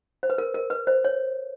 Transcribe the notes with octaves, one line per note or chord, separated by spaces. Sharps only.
C5
B4
A#4
A#4
B4
C5
C#5